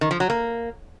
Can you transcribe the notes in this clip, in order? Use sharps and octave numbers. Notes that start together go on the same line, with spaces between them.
D#3
F3
F#3
A#3